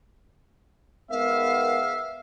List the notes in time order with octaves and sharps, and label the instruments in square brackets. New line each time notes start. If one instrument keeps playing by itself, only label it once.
[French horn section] G#2 G#3 B3 [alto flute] A#4 [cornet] E5 [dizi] F5